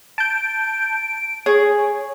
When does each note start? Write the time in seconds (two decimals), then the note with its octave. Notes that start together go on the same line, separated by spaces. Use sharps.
0.18 A5 G6 D7
1.46 G#4 C#5